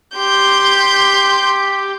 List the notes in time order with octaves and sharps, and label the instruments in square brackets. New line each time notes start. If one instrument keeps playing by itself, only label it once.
[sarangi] G4 [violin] C6 G6